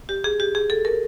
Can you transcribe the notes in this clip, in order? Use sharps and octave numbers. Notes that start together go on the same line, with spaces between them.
G4
G#4
G4
G#4
A4
A#4